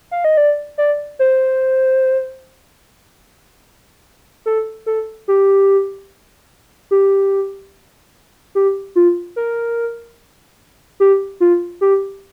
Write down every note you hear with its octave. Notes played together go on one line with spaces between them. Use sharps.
F5
D#5
D5
D5
C5
A4
A4
G4
G4
G4
F4
A#4
G4
F4
G4